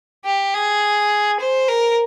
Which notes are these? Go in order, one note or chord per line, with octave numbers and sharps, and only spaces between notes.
G4
G#4
C5
A#4